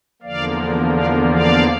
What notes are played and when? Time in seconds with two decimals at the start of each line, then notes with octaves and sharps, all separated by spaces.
0.22 E2 D3 F3 A#3 D5 F5
0.95 D5 F5
1.32 D5 F5